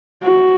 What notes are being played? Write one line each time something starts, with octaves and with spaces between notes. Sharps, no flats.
F#4